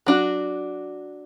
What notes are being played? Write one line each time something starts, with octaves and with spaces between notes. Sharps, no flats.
F#3 D4 F#4